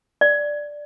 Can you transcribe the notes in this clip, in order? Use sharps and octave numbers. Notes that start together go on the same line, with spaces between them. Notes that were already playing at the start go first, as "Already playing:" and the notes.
D5